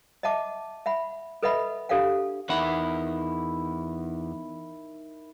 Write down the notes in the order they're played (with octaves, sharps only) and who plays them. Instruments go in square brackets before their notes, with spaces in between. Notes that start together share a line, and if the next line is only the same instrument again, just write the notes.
[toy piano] D#5 E5 F#5 A5 D6
E5 F#5 B5
A4 B4 D#5 E5 F#5 B5
D4 G4 A4 D5 F5 F#5
[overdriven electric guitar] E2 F#5 [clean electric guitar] D#3 E4